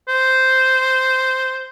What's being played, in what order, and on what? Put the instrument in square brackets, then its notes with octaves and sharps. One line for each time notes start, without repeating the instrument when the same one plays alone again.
[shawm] C5